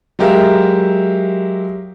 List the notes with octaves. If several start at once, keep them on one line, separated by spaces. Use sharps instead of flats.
F#3 G#3 G4 A#4 E5 F5